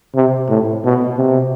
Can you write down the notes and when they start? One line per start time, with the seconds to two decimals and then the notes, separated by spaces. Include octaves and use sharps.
0.15 C3
0.49 A2
0.84 B2
1.18 C3